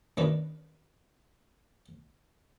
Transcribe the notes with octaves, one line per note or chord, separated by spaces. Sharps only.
F#2 D#3 D4 B4